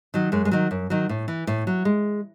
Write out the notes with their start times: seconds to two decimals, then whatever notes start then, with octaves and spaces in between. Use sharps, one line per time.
0.14 D#3 F#3
0.32 F#2 G#3
0.45 G#3
0.51 D#3 F#3
0.71 F#2
0.90 D#3 F#3
1.09 A2
1.28 E3
1.47 A2
1.67 F#3
1.85 G#3